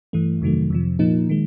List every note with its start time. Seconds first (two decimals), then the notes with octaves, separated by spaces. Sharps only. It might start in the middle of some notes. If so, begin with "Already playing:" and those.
0.13 G2 E3 A3
0.42 F2 C3 D#3 F#3 A3
0.70 F2 C3 F3
0.99 A#2 F3 A#3 D#4
1.29 D#3 G#3